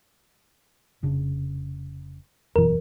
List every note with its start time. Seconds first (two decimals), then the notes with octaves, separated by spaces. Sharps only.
1.03 F1 C#3 D4
2.56 F1 F#2 B2 E3 A#4